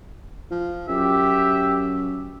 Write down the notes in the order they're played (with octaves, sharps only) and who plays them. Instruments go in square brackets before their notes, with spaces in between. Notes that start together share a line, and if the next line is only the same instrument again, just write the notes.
[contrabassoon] F3
[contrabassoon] F#2 [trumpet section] G4 [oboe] E5